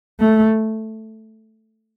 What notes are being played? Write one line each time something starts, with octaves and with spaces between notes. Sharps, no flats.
A3